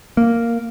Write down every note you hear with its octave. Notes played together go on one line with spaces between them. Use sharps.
A#3